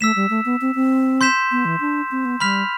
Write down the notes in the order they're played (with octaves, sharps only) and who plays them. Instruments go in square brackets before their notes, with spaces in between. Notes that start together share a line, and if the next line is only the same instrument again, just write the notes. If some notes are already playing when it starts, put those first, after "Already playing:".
[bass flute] A3 [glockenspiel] E6 B6 E7
[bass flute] G3
A3
B3
C4
C4
[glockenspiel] C6 G6 B6 E7
[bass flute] B3
E3
D4
C4
B3
[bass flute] G3 [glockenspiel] B5 F6 B6 F7